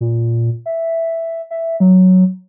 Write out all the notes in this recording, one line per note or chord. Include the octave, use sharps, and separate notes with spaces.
A#2
E5
E5
F#3